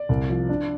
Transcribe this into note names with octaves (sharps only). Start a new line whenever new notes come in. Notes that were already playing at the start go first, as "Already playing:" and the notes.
Already playing: D5
C2
F3
D4